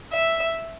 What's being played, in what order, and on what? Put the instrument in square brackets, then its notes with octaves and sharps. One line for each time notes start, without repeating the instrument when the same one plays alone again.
[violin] E5